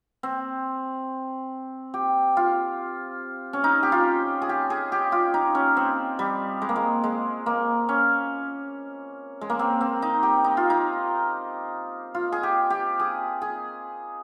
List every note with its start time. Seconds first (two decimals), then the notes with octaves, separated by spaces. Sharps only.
0.23 C4
1.94 G4
2.37 F4
3.53 C#4
3.64 D#4
3.83 G4
3.92 F4
4.42 G#4
4.49 G4
4.70 G#4
4.92 G4
5.12 F4
5.34 D#4
5.55 C#4
5.77 C4
6.19 G3
6.62 G#3
6.69 A#3
6.76 G#3
7.04 G#3
7.46 A#3
7.89 C#4
9.41 G#3
9.50 A#3
9.59 C4
9.81 C4
10.02 D#4
10.23 G4
10.44 D#4
10.57 F4
10.70 D#4
12.15 F4
12.32 G#4
12.43 G4
12.70 G4
13.00 G#4
13.42 G#4